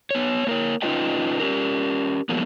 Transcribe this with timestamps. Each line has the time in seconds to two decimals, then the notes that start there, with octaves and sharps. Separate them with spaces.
0.11 B3 C#5
0.47 A#3 A#4 C#5
0.82 C#4 D#4 F4 B4 D#5 G5
1.40 C#4 G4 A#4
2.29 F3 F#3 G#3 A#3 B3